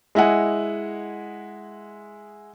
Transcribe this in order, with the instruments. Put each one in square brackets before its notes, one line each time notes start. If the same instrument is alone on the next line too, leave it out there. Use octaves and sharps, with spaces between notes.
[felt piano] G#3 E4 D#5 F#5 G#5